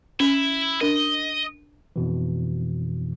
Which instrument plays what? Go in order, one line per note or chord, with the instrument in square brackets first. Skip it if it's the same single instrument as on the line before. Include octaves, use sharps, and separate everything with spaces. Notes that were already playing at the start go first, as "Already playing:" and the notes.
[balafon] C#4 [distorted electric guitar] E4
[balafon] D4 A#4 [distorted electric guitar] D#5
[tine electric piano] F2 B2 E3